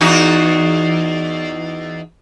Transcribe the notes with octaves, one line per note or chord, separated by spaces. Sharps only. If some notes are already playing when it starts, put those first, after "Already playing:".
E2 D#4 F#4